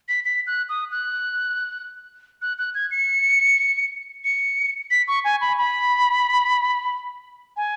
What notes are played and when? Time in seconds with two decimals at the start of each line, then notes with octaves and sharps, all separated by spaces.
0.09 B6
0.25 B6
0.47 F#6
0.69 D#6
0.92 F#6
2.42 F#6
2.58 F#6
2.75 G#6
2.91 C#7
4.24 C#7
4.91 B6
5.08 C#6
5.24 G#5
5.41 B5
5.58 B5
7.57 G#5